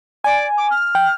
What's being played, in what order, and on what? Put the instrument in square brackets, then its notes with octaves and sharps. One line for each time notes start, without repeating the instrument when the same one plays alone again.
[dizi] D5 [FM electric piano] G#5
[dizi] D6
F6
[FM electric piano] G5